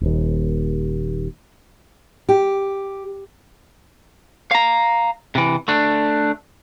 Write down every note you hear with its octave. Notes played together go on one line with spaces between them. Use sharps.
D#1 D#2
G4
F5 A#5
C3 E3
A3 D4